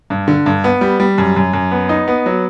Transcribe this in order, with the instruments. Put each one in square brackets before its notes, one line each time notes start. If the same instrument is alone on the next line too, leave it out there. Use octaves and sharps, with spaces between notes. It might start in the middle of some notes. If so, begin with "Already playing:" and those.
[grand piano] G2
D3
G2
B3
G3
G3
F#2
F#2
F#2
B3
D#4
B3
F#3